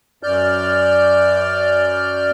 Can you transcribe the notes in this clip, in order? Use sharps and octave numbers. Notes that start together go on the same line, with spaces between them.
F#2 D5 F6 G6